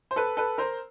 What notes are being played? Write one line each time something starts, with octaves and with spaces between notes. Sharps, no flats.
C5
A4 B4
A4 B4
A#4 C5